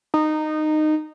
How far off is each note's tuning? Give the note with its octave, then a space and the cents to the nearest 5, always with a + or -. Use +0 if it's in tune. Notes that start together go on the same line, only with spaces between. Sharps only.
D#4 -15